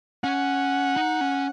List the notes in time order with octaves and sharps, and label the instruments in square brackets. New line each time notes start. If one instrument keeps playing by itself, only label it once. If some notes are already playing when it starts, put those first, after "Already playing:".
[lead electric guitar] C#4 [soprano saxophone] F#5
[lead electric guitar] D#4
C#4